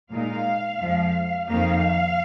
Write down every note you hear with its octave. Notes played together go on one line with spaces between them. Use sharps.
A#2 G#3 D#4 F5
F2 F3 G#3
F2 D#3 A#3 D#4 F5